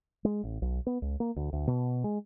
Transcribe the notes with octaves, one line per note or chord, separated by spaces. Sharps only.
G#3
A1
B1
B3
C#2
A#3
D2
D2
B2
G#3